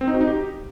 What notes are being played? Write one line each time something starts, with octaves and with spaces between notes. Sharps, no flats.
C4
D#4
F#4
D#4
G4